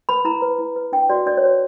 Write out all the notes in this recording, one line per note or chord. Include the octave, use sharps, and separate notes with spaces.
B4 B5
E4 A#5
B4
E4
B4
D4 G5
F#4 B4 D5
D4 D5
C#5
F#4 B4